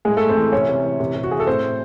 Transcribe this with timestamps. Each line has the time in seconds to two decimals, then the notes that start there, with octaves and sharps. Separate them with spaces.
0.05 A2 G#3 G#4
0.17 A3 A4
0.21 A2
0.29 C4 C5
0.36 E3
0.52 C3 C#4 C#5
0.69 C3
0.84 E3
1.00 C3
1.16 C3
1.24 F#4
1.31 E3 G#4
1.40 A4
1.47 A2 C4 C5
1.63 A2